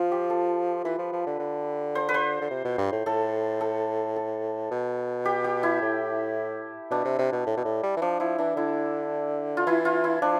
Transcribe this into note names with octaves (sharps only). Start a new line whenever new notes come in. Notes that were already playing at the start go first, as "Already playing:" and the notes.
Already playing: F3 F4
G4
A4
E3 B4
F3
F3
D3
D3
C5
B4
C5
D3
C3
B2
G2
A2
A2 A4
A4
A4
B2
G4
G4
E4
A2
B2 D4
C3
C3
B2
A2
B2
A2
G3
E3
F3 D4
F3 E4
E3 D4
D3 E4
F4
E3 E4
F4
E4
F3 D4